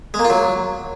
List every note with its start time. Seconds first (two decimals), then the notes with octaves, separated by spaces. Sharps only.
0.14 G#3
0.19 A#3
0.25 F4
0.30 F#3